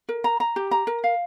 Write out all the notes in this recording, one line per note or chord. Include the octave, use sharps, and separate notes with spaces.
A#4
A#5
A#5
G4
A#5
A#4
F5